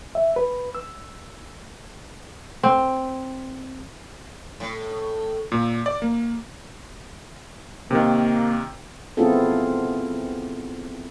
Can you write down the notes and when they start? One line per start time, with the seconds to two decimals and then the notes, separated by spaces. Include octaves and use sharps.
0.15 E5
0.36 B4
0.75 E6
2.63 C4
4.60 A2
5.52 A#2
5.86 D5
6.02 A#3
7.91 C3 D#3 A#3
9.17 B3 C4 E4 F4 G#4 A4